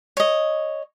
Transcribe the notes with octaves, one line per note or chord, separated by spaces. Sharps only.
C#5 D#5